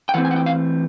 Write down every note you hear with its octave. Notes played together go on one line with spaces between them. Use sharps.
G5
E3 A3 C4 F#5
G#5
F#5
G5
F5